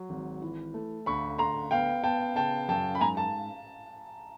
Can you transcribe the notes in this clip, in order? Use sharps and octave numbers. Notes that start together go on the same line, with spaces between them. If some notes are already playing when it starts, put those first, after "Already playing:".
Already playing: F#3
G#1
E3
A3
D2 B5 C#6
D2 A#5 C6
B3 F5 G5
B3 G5 A5
C#3 G5 A5
F#2 G5 A5
B5
G#2 G#5 A#5
A5